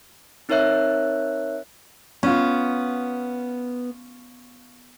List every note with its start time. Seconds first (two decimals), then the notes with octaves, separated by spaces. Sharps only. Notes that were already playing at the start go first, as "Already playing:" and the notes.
0.49 C4 D#4 A#4 C#5 E5 F#6
2.23 B3 C#4 F4